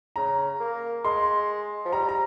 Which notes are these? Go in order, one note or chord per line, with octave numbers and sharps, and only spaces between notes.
C#3 A#5
A#3
G#3 C6
F3
G3 A#5
A#5